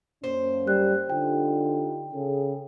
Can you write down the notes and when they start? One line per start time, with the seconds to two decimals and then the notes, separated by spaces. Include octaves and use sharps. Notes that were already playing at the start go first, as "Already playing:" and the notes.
0.24 F#2 A#3 C#4 C5
0.67 G3 F#6
1.10 D3 D#4 F4 G4 G5
2.14 C#3 G#4 A4